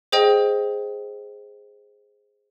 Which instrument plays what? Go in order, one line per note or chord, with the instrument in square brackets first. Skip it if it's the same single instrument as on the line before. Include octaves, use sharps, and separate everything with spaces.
[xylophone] G#4 C5 D#5 G5